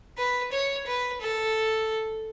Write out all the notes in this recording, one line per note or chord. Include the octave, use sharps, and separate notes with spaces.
B4
C#5
B4
A4